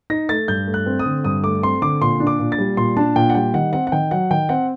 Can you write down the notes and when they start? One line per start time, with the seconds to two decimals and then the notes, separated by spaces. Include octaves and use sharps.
0.10 D#4 A#6
0.29 A3 A6
0.48 G2 G6
0.67 A3
0.74 F#6
0.86 C4
0.99 D#6
1.05 D3
1.24 G2 D#6
1.44 A3 D6
1.63 C4 C6
1.82 D3 D6
2.01 A#2 C6
2.20 D4
2.27 D6
2.40 A#2
2.52 A6
2.59 G3
2.77 A#2 C6
2.97 D4 A5
3.16 A#2 G5
3.30 F#5
3.35 G3 G5
3.54 D#3 F#5
3.73 C4 F#5
3.87 F#5
3.92 D#3 G5
4.11 F#3 F#5
4.31 D#3 G5
4.49 C4 F#5